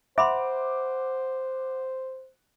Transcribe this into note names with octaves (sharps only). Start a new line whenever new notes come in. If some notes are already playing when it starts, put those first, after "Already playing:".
C5 E5 F#5 B5 C6 D6